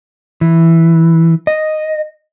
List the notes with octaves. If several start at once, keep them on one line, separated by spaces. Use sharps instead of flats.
E3
D#5